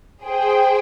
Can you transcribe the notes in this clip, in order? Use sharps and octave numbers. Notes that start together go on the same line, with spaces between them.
G#4 C5 G5